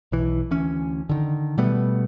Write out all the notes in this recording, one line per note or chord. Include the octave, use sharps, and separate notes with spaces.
B1 E3
D2 E3 C#4
D3 D#3
B2 G3 A3 B3